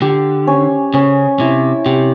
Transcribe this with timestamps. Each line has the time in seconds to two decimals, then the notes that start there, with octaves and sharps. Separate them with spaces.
0.02 D3 G4
0.47 C#4
0.94 C#3 C#4
1.40 C3 E4
1.86 C3 G4